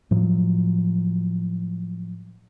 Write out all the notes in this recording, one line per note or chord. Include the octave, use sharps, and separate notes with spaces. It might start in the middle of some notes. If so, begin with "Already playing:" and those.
A2 F3 F#3